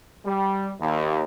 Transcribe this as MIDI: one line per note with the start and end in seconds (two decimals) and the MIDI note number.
0.25 0.71 55
0.80 1.23 39